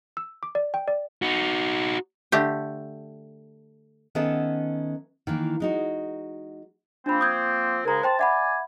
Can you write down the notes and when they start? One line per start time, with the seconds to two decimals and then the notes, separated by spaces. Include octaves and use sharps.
0.17 E6
0.43 D6
0.55 D5
0.74 G5
0.88 D5
1.22 D#4 F#4
2.32 D3 A3 G4
4.15 D#3 B3 C#4 A4 E5 F#5
5.27 D#3 E3 A#3
5.60 G#3 D#4 F#4
7.06 F3 A#3 C4 D4 B5
7.21 D#6 G6 G#6
7.85 G#2 C#3 G#3 A#4 A#5
8.03 C5 G5 A5 C6
8.19 D5 E5 F#5 G#5 B5